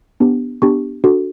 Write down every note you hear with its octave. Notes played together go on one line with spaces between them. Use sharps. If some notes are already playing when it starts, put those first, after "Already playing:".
B3 D4 G4
B3 D4 G4 C#6
D4 F#4 A4